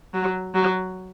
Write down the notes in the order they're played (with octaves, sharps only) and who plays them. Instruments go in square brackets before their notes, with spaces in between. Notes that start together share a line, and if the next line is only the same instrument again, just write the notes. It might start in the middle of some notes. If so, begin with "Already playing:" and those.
[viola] F#3
F#3